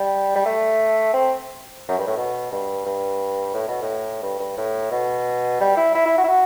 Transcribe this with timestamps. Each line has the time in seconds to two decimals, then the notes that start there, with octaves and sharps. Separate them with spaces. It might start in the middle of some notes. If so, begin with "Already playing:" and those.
Already playing: G3
0.36 G3
0.46 A3
1.14 C4
1.89 F#2
1.98 G2
2.07 A2
2.17 B2
2.52 G2
2.86 G2
3.54 A2
3.68 B2
3.82 A2
4.22 G2
4.39 G2
4.57 A2
4.91 B2
5.60 G3
5.77 E4
5.95 E4
6.06 E4
6.18 F#4
6.24 E4
6.28 F#4